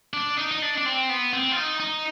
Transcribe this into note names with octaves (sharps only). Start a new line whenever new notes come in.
D4
D#4
D#4
D4
D4
C4
B3
C4
F4
D#4
D#4